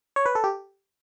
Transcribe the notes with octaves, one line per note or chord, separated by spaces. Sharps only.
C#5
B4
A4
G4